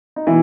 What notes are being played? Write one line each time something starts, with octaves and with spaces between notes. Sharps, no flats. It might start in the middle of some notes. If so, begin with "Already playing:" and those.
D#4
B2 E3 E4